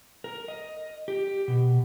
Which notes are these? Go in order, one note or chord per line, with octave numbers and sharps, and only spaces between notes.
A#4
D#5
G4
B2